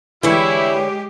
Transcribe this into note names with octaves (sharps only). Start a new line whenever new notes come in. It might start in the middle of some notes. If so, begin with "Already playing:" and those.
D3 E3 G#3 E4 G4 C#5